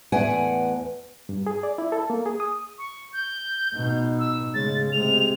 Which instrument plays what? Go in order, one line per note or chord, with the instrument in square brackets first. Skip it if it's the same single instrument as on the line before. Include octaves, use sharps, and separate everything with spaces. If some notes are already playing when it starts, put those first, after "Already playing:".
[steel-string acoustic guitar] E2 A2 B4 D5 F#5 G#5
[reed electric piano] G2
G#4
D5
E4
A4
A#3
G#4
D#6
[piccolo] C#6
G6
[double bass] B2 D#4
[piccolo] E6
[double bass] C#3 G#3 [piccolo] A6
[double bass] C3 G#3 [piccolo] F7